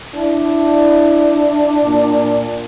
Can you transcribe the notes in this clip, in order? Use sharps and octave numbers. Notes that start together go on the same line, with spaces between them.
D4 E4
A#2